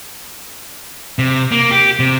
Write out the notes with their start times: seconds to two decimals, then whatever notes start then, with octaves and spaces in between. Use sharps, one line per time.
1.19 C3
1.52 A#3
1.71 G4
1.99 C3